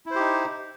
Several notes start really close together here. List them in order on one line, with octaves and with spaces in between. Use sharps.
E4 C5 G4 D#4